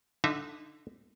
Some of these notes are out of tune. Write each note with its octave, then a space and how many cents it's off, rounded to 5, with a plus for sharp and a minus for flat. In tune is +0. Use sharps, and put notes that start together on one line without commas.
D3 +0 D#4 -20 E5 +0